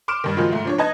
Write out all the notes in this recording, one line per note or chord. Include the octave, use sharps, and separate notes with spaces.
C6 D6 F6 D7 E7
G2 D#3
D#3 F3 F#3 G#3 F4
G#2 A3
F3 D4 C#5
D#4 B4 D#5 A5 G#6